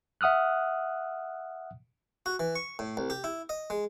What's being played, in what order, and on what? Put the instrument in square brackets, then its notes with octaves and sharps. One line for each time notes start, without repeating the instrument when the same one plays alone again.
[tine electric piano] E5 F#5 D#6 F6 F#6
[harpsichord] F#4
E3
C#6
A2
C2
G4
E4
D#5
G#3